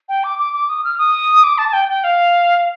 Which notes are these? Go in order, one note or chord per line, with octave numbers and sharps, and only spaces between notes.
G5
D6
D6
D6
D#6
F6
D#6
D6
A5
A5
G5
G5
F5